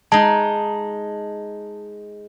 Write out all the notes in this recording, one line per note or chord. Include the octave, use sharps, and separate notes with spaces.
G#3 D#4 A5